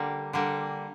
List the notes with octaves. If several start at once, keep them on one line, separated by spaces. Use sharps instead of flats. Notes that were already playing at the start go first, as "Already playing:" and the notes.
Already playing: D3 G3 A#3
D3 G3 A#3